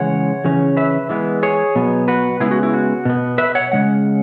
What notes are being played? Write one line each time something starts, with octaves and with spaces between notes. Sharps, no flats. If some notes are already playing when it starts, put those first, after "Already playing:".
Already playing: C#3 E3 G#3 C#5 F#5
C#3 E3 C#4
B4 E5
E3 G#3 B3
G#4 C#5
B2 F#3 B3
F#4 B4
C#3 G#3 B3 E4 G#4
F#4
E4
F#4
B2 B3
B4 E5
C#5 F#5
C#3 G#3 F#5